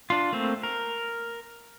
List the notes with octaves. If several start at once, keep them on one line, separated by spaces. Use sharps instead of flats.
D4 F4
A3 A#3 C4
A#4